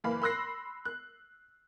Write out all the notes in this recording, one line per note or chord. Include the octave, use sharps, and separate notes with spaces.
F#1 E3 A#3 F5 B5
B5 C6 E6 F#6 A#6 C7
F#6